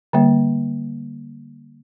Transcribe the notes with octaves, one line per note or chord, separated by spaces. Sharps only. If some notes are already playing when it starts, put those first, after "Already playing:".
D3 G3 A#3